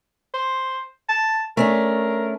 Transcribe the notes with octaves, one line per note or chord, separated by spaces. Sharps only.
C5
A5
A3 C#4 D4 A#4